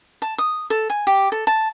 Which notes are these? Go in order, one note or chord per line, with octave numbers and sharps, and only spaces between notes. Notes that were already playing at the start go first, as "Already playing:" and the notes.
A5
D#6
A4
G#5
G4
A4
A5